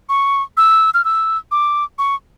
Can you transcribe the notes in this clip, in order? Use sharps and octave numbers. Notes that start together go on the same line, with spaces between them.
C#6
E6
F6
E6
D6
C#6